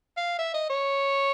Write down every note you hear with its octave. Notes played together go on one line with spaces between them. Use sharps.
F5
E5
D#5
C#5